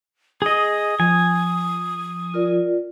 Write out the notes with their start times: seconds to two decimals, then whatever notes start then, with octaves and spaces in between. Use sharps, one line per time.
0.42 G#4 D#5 D#6
1.00 F3 G#5
2.34 F4 A#4 D5